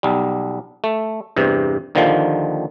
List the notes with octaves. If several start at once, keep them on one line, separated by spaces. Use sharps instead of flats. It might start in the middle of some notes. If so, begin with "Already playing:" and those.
B1 G3
A3
E2 G2 C3
D#2 D3 D#3 F3